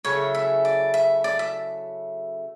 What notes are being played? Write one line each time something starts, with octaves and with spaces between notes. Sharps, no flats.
C#3 F#3 A3 E4 C#5
E5
D5
E5
D5
E5